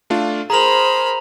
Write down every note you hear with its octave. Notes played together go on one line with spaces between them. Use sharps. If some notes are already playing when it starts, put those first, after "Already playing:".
A3 D4 F4
G#4 A#4 C5 A#5 B5 F7